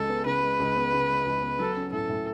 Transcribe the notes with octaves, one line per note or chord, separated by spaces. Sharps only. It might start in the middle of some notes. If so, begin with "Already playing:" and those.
Already playing: C#2 C#3 G#3 A4
B3
C#3 B4
G#3
C#2
B3
C#3
G#3
C#2
B3
F#3 A4
C#4
A2 A4
A2